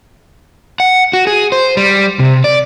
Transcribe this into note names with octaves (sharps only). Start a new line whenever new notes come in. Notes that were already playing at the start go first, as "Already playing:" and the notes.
F#5
F#4
G#4
C5
G3
C3
D5